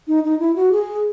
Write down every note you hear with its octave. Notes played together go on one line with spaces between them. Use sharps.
D#4
D#4
E4
F#4
G#4